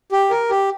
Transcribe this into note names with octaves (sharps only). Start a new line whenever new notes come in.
G4
A#4
G4